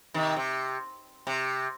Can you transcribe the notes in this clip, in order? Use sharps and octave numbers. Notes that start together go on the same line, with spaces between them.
C3 D#3
C3
C3